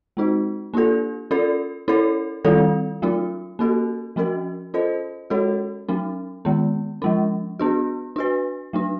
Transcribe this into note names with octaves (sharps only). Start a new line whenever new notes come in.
G#3 C4 D#4 F#4
A#3 D4 F4 A4
C#4 F4 A4 D5
C#4 E4 A4 D5
D#3 G3 C4 F4 A4
F#3 A3 C#4 F4
A#3 C#4 F#4 A4
F3 A3 C#4 F#4 A#4
C#4 F4 A4 C5 D#5
G#3 C#4 F#4 A4 C#5
F#3 A3 C#4
D#3 G#3 B3
F3 G#3 C#4
B3 D4 F#4
D4 F#4 B4
F#3 A3 D4